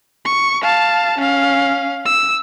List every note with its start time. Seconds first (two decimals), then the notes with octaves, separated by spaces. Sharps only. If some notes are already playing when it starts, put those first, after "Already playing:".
0.25 C#6
0.63 F5 A5
1.18 C#4 F5
2.05 E6